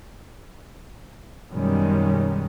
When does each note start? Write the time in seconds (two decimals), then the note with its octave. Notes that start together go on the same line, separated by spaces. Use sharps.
1.50 F#2 B2 D#3 G3 G#3 C#4